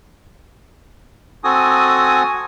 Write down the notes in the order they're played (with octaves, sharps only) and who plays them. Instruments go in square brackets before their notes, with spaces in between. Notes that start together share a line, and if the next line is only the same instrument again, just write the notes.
[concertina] C4 F#4 A4 G#5 D#6